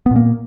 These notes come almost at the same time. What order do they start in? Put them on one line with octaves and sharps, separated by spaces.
B3 A#2 A#3